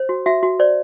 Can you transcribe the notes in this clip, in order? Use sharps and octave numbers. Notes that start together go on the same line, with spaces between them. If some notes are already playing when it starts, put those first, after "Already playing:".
Already playing: C5
F#4
F#4 E5
F#4
C5 D5